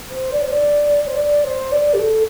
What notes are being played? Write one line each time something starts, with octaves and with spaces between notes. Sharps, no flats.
C5
D5
C5
D5
C5
D5
C5
D5
G4
A4